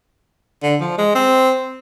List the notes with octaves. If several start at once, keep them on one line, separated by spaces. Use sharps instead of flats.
D3
F3
G#3
C4